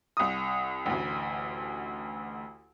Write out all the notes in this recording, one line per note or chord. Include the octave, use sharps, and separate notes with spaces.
C2 D#6
A1 D2